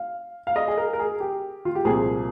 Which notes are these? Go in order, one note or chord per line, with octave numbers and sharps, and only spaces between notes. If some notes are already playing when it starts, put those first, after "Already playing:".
Already playing: F5
F5
D#5
G#4
A#4
A#4
G#4
G4
F4
G4
C2 A#2 F3 G#4